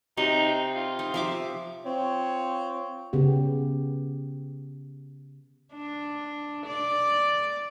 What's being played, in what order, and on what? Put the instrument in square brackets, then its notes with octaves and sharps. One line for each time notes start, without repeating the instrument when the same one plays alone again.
[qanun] C3 [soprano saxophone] D#4
[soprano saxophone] F4
[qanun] D#4
F3 E5 D6
[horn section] C4 F4 C#5
[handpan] C#3 B3 G4
[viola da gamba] D4
D5